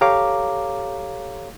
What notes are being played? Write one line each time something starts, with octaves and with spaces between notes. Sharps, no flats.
G4 A4 C#5 F5 A#5 D6